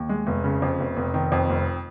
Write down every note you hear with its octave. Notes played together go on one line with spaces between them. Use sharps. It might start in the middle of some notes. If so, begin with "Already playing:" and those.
Already playing: D#2
G#3
F1
C#3
F2
F1
F1
D#3
F2
F1